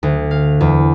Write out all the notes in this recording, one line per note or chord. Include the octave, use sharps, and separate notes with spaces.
D2
F5
E2